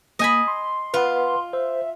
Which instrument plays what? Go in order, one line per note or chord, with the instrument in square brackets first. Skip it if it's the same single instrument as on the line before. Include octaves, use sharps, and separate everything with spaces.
[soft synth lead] A#3 [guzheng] D#5 G#5 B5
[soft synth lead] C6
[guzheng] F4 [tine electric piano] B4 F#5
[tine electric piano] C5 [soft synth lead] E5